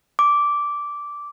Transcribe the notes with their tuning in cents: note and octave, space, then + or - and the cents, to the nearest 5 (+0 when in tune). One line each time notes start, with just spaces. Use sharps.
D6 -10